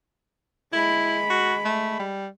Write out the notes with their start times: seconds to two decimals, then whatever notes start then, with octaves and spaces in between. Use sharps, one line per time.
0.73 G#3 E4 B5
1.30 F#4
1.65 A3
1.99 G3